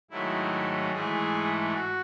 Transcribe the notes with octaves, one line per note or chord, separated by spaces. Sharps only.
G#2 D#3 F#3 A3 E4
G#2 E3 A3 G#4
F#4